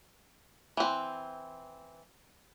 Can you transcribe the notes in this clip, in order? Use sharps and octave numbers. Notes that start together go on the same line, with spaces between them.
E3 C4